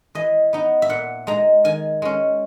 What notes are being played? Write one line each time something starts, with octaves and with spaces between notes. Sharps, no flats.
E3 D#5
B3 D#4
E5
A#2 F#5
G#3 D#4 A#5
D#3 G#5
G#3 C#4